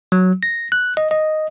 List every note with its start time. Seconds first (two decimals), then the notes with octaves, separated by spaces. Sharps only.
0.12 F#3
0.43 A#6
0.72 F#6
0.97 D#5
1.11 D#5